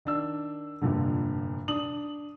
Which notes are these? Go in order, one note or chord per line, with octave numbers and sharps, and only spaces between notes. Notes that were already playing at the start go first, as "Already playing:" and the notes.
D#3 D4 E6
F1 G2 A#2 D3
D4 D#6 F#7